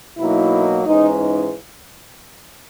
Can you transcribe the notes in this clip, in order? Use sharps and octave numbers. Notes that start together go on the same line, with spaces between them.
B2 F#3 A#3 D#4 E4
G#2 E3 G#3 C#4 D#4
D#4